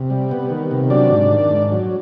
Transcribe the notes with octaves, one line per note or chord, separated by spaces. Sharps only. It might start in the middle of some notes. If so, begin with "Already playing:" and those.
Already playing: C3
G3
B3
D#3
C3
F#3 D4 D5
G#2
D#3
G#2
F#3